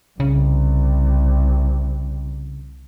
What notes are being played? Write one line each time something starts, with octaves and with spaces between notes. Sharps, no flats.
C2 C#3